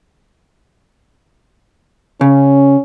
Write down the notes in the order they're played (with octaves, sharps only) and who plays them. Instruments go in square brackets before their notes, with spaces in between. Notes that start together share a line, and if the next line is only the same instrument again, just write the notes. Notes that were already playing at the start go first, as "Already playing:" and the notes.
[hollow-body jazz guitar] C#3 [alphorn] C#4